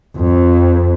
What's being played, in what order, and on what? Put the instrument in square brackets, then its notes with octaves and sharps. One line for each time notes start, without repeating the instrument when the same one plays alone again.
[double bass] F2